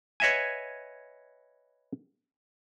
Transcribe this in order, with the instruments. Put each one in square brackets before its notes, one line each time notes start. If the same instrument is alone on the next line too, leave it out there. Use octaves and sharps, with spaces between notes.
[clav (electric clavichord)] B4 C#5 D#5 E5 F#5 G#5